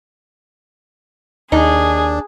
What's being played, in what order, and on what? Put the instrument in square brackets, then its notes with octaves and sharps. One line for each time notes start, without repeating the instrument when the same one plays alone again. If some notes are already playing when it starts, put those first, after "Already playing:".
[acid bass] D#2 [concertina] D4 [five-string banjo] D#4 [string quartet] G#4